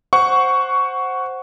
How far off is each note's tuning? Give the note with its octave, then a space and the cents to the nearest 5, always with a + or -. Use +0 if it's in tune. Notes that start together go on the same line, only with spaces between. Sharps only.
C5 +0 F#5 +0 C#6 +10